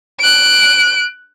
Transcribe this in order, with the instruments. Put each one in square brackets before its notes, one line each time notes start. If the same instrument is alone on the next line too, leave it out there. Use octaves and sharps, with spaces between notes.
[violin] F#6 D7